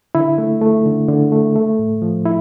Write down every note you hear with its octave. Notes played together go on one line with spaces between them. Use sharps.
D3 E4
A3
A3
D3
D3
A3
A3
A2
F3
E4